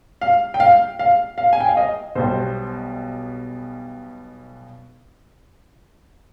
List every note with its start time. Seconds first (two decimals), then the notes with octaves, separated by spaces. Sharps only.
0.21 F5
0.54 G5
0.60 F5
0.99 F5
1.38 F5
1.53 G#5
1.60 G5
1.69 F5
1.77 D#5
2.15 B1 B2 G3 C5